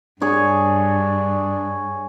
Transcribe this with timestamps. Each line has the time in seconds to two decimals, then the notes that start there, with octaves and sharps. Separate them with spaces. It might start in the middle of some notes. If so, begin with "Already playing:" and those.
0.22 G2 D4 G#4 C#5